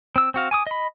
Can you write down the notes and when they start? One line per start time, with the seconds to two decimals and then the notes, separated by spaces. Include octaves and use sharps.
0.16 C4 E6
0.34 C4 F#4 F5
0.51 G#5 D6 D#6
0.67 D#5 B5